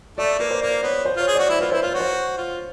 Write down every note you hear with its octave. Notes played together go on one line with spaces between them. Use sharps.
A3 D5
A#3 B4
C5
A#3 D5
B3 C#5
C5
F4 C#5
G#4
F#4 D5
E4 C5
F4 B4
E4 C5
F4 C5
F#4 C#5
C5
F4